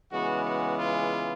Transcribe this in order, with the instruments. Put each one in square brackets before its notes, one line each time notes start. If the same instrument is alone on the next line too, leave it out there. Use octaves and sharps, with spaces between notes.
[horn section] C#3 E3 G#3 B3 F#4
F#4
F4